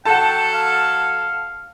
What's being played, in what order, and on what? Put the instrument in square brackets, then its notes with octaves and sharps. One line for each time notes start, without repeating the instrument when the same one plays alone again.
[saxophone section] F#3 A4 [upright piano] F#5 A5 [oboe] G5
[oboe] F5